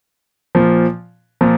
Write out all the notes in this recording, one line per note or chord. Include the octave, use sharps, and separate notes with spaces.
A#2 F3
A#2 F3